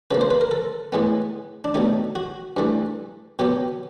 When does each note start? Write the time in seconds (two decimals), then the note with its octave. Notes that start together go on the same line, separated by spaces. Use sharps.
0.11 C#3 F3 A#3 B4
0.21 C5
0.31 B4
0.41 A#4
0.51 A4
0.92 A2 E3 G#3 B3
1.64 D4
1.74 B2 F#3 A3 D#4
2.15 F#4
2.57 G2 E3 A3
3.39 B2 F#3 B3 G4